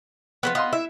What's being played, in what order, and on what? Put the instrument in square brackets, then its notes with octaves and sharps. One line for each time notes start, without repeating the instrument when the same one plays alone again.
[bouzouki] F3 G3 B3
[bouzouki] B3 [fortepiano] D#5 F5 C6
[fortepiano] E4 [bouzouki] E5